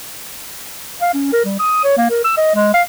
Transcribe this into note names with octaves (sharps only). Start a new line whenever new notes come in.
F5
C#4
A#4
G3
D#6
C#5
A#3
A#4
E6
D#5
G#3
F5